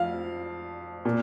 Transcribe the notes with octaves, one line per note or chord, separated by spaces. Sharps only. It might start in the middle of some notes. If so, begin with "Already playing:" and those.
Already playing: F2 F3 F5
A#2